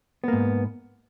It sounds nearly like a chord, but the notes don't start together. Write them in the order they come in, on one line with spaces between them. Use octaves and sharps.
B3 A#3 G#2